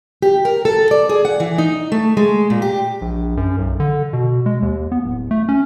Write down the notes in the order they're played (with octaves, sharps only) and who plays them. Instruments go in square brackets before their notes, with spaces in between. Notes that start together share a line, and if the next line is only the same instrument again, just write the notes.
[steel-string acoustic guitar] G4
A#4
A4
D5
G#4
F#5
E3
D#4
A3
G#3
A#2
G4
[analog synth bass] A#1
F#2
B1
D3
B2
G#3
D#2
B3
D1
A3
C#4